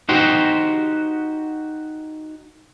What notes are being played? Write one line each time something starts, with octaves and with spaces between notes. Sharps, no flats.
D#4 F#4 G4 C5